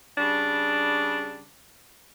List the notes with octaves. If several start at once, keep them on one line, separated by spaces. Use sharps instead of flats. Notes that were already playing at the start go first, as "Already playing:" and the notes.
C#3 G3 D4